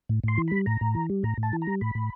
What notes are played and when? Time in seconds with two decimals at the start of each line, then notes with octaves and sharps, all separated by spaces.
0.09 A2
0.24 A2 C6
0.37 E3
0.48 G3 B5
0.66 A2 A#5
0.81 A2
0.95 E3
1.10 G3
1.23 A2 A#5
1.38 A2
1.43 A5
1.53 E3
1.62 A#5
1.67 G3
1.81 A2 B5
1.95 A2